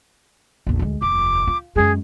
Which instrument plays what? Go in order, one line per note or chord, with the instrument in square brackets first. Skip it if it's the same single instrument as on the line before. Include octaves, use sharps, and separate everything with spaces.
[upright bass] A#1 E2
D2 G#3
[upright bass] F1 D#2 [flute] D6
[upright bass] F4
[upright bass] F#2 G#3 [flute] G#4